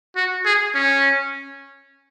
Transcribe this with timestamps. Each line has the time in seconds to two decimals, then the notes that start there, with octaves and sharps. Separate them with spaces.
0.16 F#4
0.45 G#4
0.74 C#4